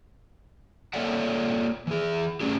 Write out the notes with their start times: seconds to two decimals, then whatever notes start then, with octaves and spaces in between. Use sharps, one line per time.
0.93 A#3 A4 C#5 D5 E5 F#5
1.87 E3 G#4
2.40 A3 C#4 D4 G4 G#4